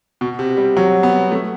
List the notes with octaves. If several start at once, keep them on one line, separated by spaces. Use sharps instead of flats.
B2
C3
G3
F#3
B3
A3